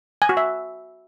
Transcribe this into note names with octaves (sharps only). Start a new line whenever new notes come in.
G#5
F#4
E5